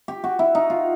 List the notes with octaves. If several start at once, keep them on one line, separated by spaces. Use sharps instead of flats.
G4
F#4
E4
D#4
F4